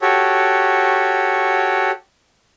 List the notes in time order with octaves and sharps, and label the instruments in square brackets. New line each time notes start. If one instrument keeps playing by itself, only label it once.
[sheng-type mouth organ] F#4 G4 A4 C#5